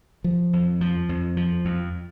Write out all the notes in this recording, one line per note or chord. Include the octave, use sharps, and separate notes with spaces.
F3
F2
F3
F2
F3
F2